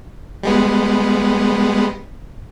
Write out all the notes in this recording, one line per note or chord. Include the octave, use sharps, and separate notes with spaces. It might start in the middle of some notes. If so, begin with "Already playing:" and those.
G3 G#3 B3